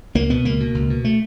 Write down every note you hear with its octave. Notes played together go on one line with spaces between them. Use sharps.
C#2 A#3
B2 B3
C#2 A#3
B2
C#2
B2
A3